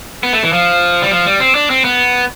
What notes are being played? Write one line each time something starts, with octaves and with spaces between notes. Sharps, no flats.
B3
A3
E3
F3
G3
F3
G3
C4
D4
C4
B3